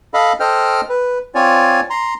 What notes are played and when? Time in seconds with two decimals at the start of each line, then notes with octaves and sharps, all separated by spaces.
0.14 A4 D#5 F5 B5
0.40 A4 C5 D#5 G5 F6
0.89 B4
1.35 C4 F4 C#5 D5 G#5
1.90 A#5 C6